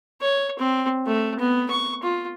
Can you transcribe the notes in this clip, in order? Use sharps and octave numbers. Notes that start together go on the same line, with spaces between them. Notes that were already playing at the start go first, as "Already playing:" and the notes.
C#5
C4
A3
B3
C#6
F4